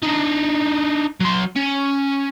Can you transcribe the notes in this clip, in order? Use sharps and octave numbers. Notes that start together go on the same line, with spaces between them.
D4 D#4
F#3 C6
C#4